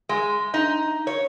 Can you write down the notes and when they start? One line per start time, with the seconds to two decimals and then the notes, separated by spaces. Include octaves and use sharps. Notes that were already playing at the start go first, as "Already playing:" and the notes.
0.09 G#3
0.54 D#4
1.07 C#5